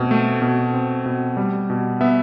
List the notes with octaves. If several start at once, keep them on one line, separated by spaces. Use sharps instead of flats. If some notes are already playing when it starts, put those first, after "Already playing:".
Already playing: B2 A3 C4
A3
B2
C4
B2
G3
B2
B3 E5